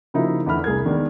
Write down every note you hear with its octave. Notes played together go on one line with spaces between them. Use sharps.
C#3 F3 A#3 D#4 E4 F#4
E2 D3 E4 B5 F6
C2 G#4 A#4 G#6
D#3 G#3 B3 D4